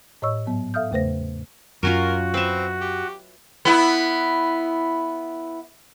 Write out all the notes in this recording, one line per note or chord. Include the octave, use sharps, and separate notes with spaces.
A2 C#5 D#5 C#6 E6
G#2 F#3 B3
A4 E5 F5 D#6 F6 G6
E2 C#3 A3 B4 C5 A#6
F#2 F#3 C#4 F4 F#4 A#4
C4 B4 E5
G4
B3 E4